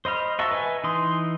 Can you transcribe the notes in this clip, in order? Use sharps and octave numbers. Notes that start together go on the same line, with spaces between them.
C5 D#5 B5 F6
F#4 D#5 E5 A5 A#5
B4 D#5 E5 G#5
E3 D#4 C6 D#6